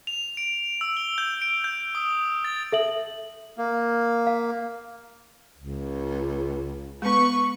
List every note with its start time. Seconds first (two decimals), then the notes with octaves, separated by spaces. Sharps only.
0.07 F7
0.37 D7
0.81 E6
0.97 G7
1.18 G6
1.42 D7
1.64 G6
1.95 D#6
2.45 A6
2.72 A4 E5 F#7
3.58 A#3
4.27 F5
5.57 C#2
7.02 G#3 B3 B4 C#6